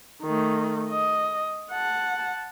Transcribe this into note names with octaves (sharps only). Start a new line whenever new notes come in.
D#3 A3
D#5
F#5 A5